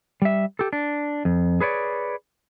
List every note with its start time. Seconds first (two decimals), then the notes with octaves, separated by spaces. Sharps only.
0.22 G3 E5
0.59 G4 A4
0.73 D4
1.25 F2
1.60 G#4 B4 C#5 D5